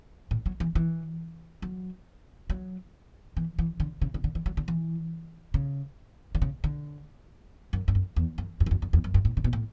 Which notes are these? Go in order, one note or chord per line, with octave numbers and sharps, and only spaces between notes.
A2
F#3
E3
E3
F#3
F#3
E3
E3
D3
C#3
C#3
D3
E3
F#3
D3
E3
C#3
D3
C#3
D3
F#2
G2
F#2
E2
F#2
F#2
E2
F#2
F#2
E2
F#2
G2
A2
C#3
B2
A2